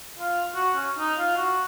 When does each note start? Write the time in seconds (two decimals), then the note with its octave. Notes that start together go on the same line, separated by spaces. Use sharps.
0.19 F4
0.55 F#4
0.76 C#4
0.98 D#4
1.18 F4
1.37 F#4